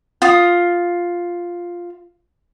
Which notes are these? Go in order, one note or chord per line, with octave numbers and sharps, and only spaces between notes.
F4 D#6